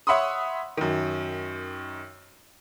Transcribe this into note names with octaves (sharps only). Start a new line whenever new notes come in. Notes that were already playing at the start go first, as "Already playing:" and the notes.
C#5 E5 F#5 B5 C6 D#6
F#2 D#3